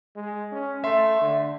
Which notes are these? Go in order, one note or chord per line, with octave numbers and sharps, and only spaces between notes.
G#3
C#4
A3 E5 C6
D3